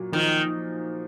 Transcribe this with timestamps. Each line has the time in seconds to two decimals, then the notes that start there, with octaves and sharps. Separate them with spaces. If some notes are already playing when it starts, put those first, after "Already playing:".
Already playing: A#2 F#3
0.12 D#3 F3